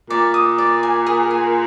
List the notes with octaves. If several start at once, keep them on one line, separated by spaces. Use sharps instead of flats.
A#2 D5
D#6
D5
G#5
G#4
G#5